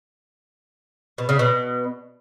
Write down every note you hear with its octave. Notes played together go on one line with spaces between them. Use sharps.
B2
C#3
B2